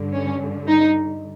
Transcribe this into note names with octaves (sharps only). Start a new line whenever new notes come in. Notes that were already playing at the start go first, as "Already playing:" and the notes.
Already playing: G2 D3
C#4
D#4